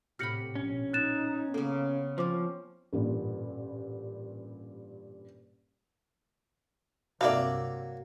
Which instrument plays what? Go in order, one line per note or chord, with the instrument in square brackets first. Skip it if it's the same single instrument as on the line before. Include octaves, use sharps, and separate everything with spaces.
[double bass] A2 C3 [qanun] G4 F#5 B5 [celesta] F6 A#6 C#7
[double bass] A#1 B2 [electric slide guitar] C#4
[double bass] D#4 [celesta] F#6 A6 E7
[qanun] C#3 A#3 [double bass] B3 [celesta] A4
[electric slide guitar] F3 [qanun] C4 C#4 [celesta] C5 D6
[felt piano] A1 G2 A#2
[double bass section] C2 G2 C4 [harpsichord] F#3 A#3 [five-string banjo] D5 E5 F5